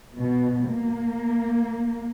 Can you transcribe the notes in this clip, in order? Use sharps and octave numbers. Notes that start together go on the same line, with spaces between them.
B2
A#3